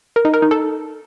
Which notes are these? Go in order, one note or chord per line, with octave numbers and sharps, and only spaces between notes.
A#4
D#4
A#4
D#4
A4